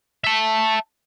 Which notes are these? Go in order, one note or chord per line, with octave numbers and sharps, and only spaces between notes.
E5 A5